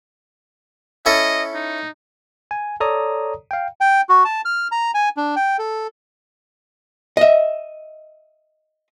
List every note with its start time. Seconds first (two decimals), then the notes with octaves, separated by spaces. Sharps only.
1.06 C#4 E4 A4 D#5
1.54 D#4
2.51 G#5
2.80 A4 C#5 D5 A#5 D#6
3.51 F5 G5
3.80 G5
4.09 F#4
4.25 A5
4.45 F6
4.71 A#5
4.94 G#5
5.17 D4
5.36 G5
5.59 A4
7.17 D#5 E5